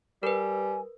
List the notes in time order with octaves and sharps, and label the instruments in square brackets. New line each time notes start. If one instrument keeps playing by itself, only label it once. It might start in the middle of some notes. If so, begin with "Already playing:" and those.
[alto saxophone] G3 [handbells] A#4 B4 [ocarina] G#5